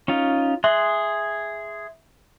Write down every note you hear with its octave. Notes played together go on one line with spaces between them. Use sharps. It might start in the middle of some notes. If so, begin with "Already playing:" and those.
C#4 D#4 F4
G#4 E5 C6 F#6